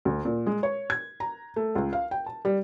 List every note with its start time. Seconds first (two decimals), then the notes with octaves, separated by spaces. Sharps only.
0.05 D2
0.25 A#2
0.46 G#3
0.63 C#5
0.90 G#6
1.20 A#5
1.56 A3
1.75 C#2
1.93 F5
2.11 G5
2.26 A5
2.45 G3